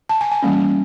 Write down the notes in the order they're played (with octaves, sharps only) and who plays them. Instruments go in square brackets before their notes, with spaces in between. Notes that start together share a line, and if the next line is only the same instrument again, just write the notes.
[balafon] A5
G#5
G#5
E3 G3 A#3 C#4